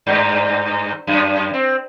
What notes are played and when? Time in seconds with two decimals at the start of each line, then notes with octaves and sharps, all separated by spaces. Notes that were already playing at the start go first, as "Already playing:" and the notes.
0.07 G2
1.07 F#2
1.54 C4